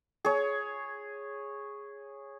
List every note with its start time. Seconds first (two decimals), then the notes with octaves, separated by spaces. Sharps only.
0.25 G#4 C#5